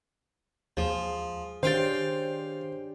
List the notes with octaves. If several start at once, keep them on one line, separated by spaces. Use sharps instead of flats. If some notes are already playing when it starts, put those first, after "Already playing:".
D#2 F3 G#4
D#3 C#4 D4 G4 C5 F5 G5 A6